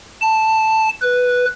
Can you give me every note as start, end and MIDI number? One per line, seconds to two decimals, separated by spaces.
0.21 0.89 81
1.01 1.45 71